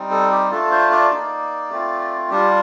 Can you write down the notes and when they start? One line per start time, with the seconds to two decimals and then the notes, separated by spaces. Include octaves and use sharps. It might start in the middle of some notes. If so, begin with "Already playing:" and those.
Already playing: G3 C4 D#4
0.11 A4
0.31 G4
0.51 A3 D4 F4 A4
0.71 C5
0.91 D5
1.11 A#3 D#4
1.70 A3 C4 F4
2.30 G3 D4 F4 G4